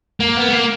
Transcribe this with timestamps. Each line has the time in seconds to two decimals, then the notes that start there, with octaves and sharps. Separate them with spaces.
0.20 A#3
0.37 B3
0.48 A3
0.53 A#3